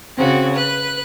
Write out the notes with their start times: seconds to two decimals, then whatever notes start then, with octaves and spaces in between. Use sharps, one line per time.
0.17 C#3 C4 F#4
0.53 B4 F#6